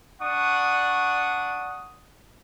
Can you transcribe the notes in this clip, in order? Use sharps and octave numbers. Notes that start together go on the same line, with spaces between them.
D4 F#5 C#6 D#6